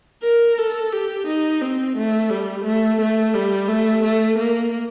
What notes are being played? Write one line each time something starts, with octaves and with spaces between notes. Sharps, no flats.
A#4
A4
G4
D#4
C4
A3
G3
A3
A3
G3
A3
A3
A#3